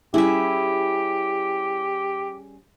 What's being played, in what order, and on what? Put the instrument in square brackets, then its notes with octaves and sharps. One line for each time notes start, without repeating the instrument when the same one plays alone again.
[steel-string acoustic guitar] G3 C#4 G#4 [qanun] E4 E5 [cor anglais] G4